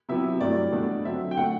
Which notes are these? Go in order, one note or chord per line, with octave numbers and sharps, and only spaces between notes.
C3 F#3 B3 E4 E5
G2 F#3 A3 E4 D5
B2 A3 D4
D3 F#3 C4 E5
G5
D3 A3 D4 F#5